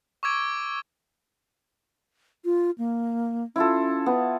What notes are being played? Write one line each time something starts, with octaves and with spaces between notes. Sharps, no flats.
C#6 D6 E6 G#6 D7
F4
A#3
C#4 E4 F4 A4
B3